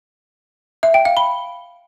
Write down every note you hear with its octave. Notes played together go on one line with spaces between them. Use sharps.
E5
G5
F5
B5